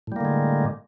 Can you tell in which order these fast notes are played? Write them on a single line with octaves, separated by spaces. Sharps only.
A2 G3 A#3 D3 G#3